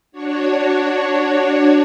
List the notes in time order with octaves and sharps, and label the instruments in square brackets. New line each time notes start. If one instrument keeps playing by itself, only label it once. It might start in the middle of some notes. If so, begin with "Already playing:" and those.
[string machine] D4 F#4 C#5